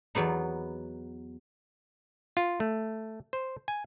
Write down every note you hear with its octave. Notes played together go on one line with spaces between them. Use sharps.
E2 F#3 B3 D#4
F4
A3
C5
G#5